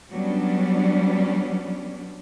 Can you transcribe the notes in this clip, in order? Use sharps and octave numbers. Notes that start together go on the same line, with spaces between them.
F#3 G3 B3 C#4 D4